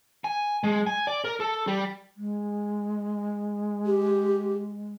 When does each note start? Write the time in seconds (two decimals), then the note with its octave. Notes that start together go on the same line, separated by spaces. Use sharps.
0.24 G#5
0.64 G#3
0.87 G#5
1.07 D5
1.24 A#4
1.40 A4
1.67 G3
2.17 G#3
3.86 G4